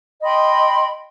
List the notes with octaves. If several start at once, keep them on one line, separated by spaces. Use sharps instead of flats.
D#5 G5 B5 C6